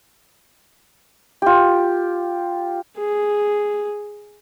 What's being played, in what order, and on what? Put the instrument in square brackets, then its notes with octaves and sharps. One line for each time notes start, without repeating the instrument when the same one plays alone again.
[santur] F4 G4
[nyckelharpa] G#4